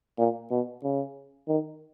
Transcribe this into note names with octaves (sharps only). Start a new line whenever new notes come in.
A#2
B2
C#3
D#3